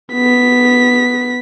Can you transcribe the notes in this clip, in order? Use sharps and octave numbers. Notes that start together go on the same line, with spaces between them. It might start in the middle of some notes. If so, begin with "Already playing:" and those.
B3 B6